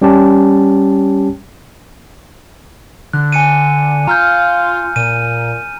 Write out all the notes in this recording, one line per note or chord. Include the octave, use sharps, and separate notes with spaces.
G3 C#4 G4 A5
D3 F#6
G#5 C#7 D#7
F4 A#5 F6 G6
A#2 D#7